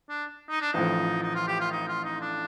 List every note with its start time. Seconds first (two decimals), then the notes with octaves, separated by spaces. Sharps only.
0.09 D4
0.50 D#4
0.61 D4
0.73 A1 A2 F3 D#4
1.22 D#4
1.35 F4
1.47 G4
1.60 F4
1.72 D#4
1.88 F4
2.04 D#4
2.21 D4